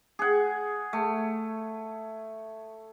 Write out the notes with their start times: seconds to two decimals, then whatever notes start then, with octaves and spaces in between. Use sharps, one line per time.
0.19 G#4 F#5
0.93 A3